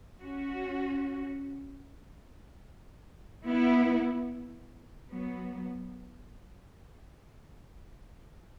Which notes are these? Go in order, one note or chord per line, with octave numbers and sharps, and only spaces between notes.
C#4 F#4
B3 E4
F#3 B3